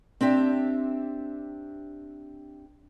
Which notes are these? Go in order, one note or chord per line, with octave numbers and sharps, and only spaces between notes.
C4 D4 G4 E5